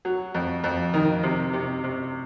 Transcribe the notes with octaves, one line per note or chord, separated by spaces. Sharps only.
F#3
F2
F2
D#3
C3
C3
C3